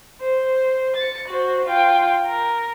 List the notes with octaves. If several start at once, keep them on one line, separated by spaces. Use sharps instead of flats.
C5
A6 C#7
F#4 C5
F4 G5
A#4